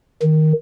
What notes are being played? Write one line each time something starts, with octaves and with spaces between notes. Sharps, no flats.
D#3